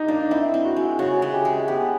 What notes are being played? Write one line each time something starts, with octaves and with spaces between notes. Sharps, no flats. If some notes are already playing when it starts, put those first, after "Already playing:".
Already playing: D#4 G4
A#3 D4
C4 E4
C4
F#4
G#3
C#3 F#4
G#3
G4
G#3
B3 G4